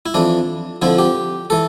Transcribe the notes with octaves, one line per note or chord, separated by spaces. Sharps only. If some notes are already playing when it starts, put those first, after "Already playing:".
E4
F2 E3 D4
F2 D3 F3 E4
G4
E3 A4